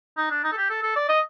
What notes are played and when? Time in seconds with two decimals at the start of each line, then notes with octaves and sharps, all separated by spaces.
0.17 D#4
0.30 D4
0.44 D#4
0.52 A4
0.57 G4
0.70 A4
0.83 A4
0.96 D5
1.09 D#5